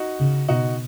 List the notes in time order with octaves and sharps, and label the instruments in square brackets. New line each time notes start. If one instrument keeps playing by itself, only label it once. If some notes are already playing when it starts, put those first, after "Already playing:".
Already playing: [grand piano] D#4 F#4
[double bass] C#3
[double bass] B2 [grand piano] D#4 F#4